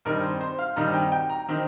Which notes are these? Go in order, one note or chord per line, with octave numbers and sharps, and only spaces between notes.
G2 D#3 C4 D#4 A#4
C5
C5
F5
G2 D#3 C4 D#4 A#5
G5
G5
A#5
D#3 C4 D#4